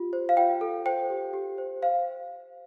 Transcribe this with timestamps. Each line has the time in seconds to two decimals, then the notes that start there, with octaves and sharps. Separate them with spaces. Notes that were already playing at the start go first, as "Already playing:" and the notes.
Already playing: F4 G4
0.13 C5
0.29 F5
0.37 F4 G5
0.61 A4
0.86 C5 G5
1.10 G4
1.33 G4
1.58 C5
1.82 C5 F5